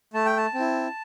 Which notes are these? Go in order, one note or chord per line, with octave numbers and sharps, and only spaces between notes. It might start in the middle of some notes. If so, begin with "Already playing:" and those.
A3 A5
G5
A5
C4
E4